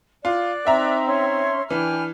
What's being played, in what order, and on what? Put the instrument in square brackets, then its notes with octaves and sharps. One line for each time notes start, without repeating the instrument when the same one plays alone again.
[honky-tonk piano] F4 [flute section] D5 D6 F#6
[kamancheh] C4 D#4 [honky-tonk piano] E5 A#5
[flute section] C#4 C#5 C6
[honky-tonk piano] E3 [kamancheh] D4 F6 [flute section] G5 G#5 B5